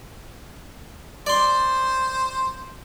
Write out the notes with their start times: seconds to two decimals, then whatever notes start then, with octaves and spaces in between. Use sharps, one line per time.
1.27 C5 D5 C6